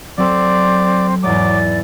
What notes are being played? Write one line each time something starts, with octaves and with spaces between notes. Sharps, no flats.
F#3 C4 A4 D5
E2 G#2 F#3 G#3 D5 D6